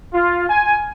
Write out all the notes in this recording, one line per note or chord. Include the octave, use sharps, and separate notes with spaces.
F4
G#5